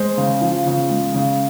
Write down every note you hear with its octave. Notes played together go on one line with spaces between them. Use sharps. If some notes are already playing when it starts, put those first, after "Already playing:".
Already playing: G#3 C5
C#3
F3
C#3
G#3
C#3